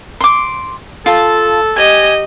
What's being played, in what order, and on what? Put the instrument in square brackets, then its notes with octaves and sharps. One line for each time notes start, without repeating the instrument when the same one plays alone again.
[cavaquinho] C6 D6
[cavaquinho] F4 A5 [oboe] A4
[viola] G4 D#5 [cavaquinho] G#5